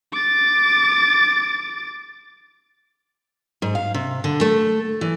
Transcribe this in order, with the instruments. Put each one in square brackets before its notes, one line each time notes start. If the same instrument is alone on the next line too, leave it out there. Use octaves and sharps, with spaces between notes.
[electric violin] D6 A6
[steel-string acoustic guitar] G#2
F5
C3
D3
A3
E3